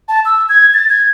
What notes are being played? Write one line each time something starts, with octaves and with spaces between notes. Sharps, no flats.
A5
E6
G#6
A6
G#6